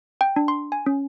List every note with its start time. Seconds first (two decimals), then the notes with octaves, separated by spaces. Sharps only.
0.21 G5
0.36 D4
0.48 C6
0.72 G#5
0.86 C#4